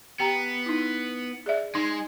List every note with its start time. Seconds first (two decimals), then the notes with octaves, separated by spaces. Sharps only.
0.20 B3 G4 G5 A#5
0.66 D#4 E4
1.46 G#4 D5 E5
1.75 G#3 D#4